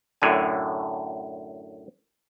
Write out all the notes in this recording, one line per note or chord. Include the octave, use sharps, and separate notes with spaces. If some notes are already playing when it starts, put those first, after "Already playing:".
F#2 A2 D3 G#5